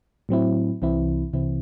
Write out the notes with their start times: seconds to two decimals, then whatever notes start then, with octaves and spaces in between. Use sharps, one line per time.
0.29 A2 F#3 C4 E4
0.82 C2 C3 E3 C4 E4
1.33 C2 C3 E3 C4 E4